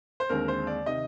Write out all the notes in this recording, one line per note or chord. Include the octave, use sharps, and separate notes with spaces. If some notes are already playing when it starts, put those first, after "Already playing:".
C5
D#2 D3 G#3 C4 A#4
C5
D5
C3 D#3 D#5